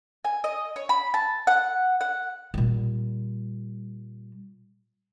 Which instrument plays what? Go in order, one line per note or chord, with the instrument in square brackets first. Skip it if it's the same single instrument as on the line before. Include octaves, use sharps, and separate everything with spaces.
[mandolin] G#5
D#5
C#5
B5
A5
F#5
F#5
[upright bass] A#2 G3